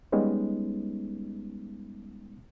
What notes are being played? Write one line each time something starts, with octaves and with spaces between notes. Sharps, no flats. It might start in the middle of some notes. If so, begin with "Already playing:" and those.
G3 G#3 B3 C#4 D#4